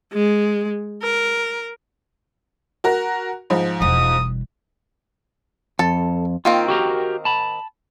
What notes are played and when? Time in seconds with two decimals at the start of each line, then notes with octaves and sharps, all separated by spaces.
0.13 G#3
1.02 A#4
2.84 F#4 A#4 A#5
3.50 G#2 F3
3.81 E1 G3 D#6
5.79 F2 A4 A5
6.45 D#3 A#3 C4 F4
6.68 F#4 G4 A#4
7.25 A5 B5